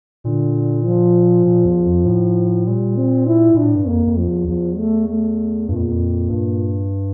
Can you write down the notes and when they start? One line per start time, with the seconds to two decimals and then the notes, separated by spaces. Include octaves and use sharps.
0.25 A#2 D3
0.86 F3
1.46 A#2
1.65 E2
1.86 F2
2.06 A2
2.67 A#2 G3
2.96 C4
3.27 E4
3.54 A#2 D4
3.65 A2
3.76 G2
3.87 F2 A#3
4.07 F2
4.17 F3
4.28 E2
4.48 E2 F3
4.78 A3
5.09 A3
5.69 G2 A#2
5.76 F2
5.83 E2
5.91 F2
6.29 G2